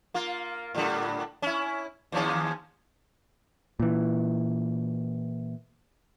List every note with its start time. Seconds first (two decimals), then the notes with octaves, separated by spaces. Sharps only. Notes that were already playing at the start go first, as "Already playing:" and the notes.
0.14 A#3 F4
0.75 A2 D3 G3
1.42 C#4 E4
2.12 D#2 F3 C#4
3.80 A#2 E3